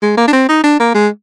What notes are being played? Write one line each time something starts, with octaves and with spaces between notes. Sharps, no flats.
G#3
A#3
D4
C4
D#4
D4
A#3
G#3